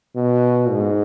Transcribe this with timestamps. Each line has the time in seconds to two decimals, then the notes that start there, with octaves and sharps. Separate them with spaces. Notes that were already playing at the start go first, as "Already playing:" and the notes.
0.16 B2
0.71 G#2